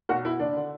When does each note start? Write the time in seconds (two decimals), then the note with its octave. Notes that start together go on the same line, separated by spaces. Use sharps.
0.09 B1 F#4
0.25 B2 E4
0.39 F#1 D4
0.56 D3